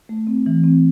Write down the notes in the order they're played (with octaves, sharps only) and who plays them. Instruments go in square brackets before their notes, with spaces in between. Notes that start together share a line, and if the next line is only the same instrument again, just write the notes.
[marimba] A3
C4
E3
C4